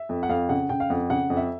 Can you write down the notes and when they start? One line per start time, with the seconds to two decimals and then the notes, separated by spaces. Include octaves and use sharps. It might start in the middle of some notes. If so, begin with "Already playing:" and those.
Already playing: E5
0.09 F2
0.23 F#5
0.29 F2 F5
0.49 C#3 F#5
0.69 C#3 G5
0.80 F5
0.90 F2 F#5
1.10 C#3 F#5
1.30 F2
1.37 E5